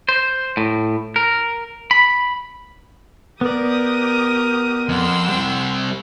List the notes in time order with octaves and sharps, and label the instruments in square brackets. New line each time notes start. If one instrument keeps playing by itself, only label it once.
[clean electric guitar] C5
A2
A#4
B5
[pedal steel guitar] B3 D5 [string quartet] G4 D#6 [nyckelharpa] A#4
[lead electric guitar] F2 [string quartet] F#5 C6 E6
[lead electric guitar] G3 C4